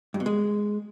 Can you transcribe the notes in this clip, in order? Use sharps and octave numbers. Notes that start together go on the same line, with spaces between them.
G2
B2
G#3